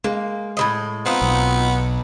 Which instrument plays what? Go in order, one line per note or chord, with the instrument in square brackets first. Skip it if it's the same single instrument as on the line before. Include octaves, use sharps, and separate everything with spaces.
[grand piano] G#3 [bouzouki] A#3
[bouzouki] A2 F3 D#5
[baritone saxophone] B3 [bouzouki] C4 D#4 F4
[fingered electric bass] B1